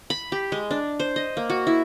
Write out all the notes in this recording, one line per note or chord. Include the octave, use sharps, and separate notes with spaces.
B5
G4
G#3
D4
C5
D#5
A#3
F#4
E4